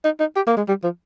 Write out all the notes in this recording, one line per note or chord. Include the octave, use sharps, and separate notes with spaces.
D#4
D#4
G4
A#3
G#3
G3
F3